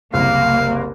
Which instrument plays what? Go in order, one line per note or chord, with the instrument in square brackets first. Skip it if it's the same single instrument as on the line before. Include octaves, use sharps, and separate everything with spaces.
[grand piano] F#1 C2 [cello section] A#3 [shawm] F5